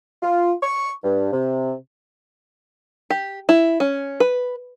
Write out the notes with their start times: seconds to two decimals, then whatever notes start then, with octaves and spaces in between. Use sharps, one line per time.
0.23 F4
0.63 C#6
1.04 G2
1.32 C3
3.10 G4
3.49 E4
3.80 C#4
4.20 B4